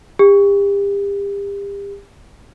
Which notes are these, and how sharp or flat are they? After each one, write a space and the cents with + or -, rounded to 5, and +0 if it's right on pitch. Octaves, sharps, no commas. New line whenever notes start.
G4 +35